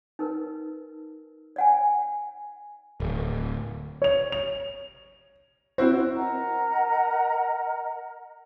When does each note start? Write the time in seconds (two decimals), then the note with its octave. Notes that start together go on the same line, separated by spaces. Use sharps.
0.19 D#4 A#4 B4
1.56 D5 F#5 G#5
3.00 D1
4.02 C#5 F7
4.32 F7
5.78 C4 E4 F#4 C5
6.17 A#4 D#5 F#5 A#5